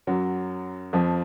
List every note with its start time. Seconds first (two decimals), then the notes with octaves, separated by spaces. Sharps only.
0.07 F#2 F#3
0.93 F2 F3